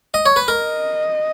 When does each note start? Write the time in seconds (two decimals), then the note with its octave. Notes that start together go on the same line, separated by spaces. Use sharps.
0.14 D#5
0.26 C#5
0.36 B4
0.48 A#4 D#5